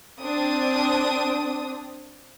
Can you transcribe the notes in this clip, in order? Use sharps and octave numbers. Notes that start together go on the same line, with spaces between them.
C4 D4 D#6